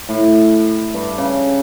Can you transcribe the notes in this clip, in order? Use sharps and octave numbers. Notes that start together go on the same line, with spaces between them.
A2
G2
C#3